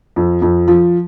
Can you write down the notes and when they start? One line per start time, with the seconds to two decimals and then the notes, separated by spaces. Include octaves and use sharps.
0.16 F2
0.42 F2
0.68 F3